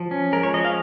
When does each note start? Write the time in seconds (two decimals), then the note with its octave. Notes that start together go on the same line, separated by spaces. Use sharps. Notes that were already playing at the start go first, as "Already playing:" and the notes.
Already playing: F3
0.11 C#4
0.33 G#3 A#4
0.43 C#5
0.54 F3 D#5
0.65 F5